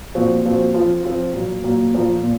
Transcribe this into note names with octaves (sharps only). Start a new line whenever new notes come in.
A#2 F3 C4 F#4
A#2 F3 C4 F#4
F3 C4 F4
F3 C4 F4
A#2 F#3 A#3
A#2 F#3 A#3
A#2 F3 A#3 F4
A#2